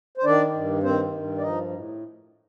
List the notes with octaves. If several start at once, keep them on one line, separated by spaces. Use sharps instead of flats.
C5
D#3 D4 D5
G2
D#3 C4 C5
G2
D5
F3 D#4 D#5
A2